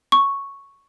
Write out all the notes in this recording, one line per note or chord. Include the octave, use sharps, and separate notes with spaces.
C#6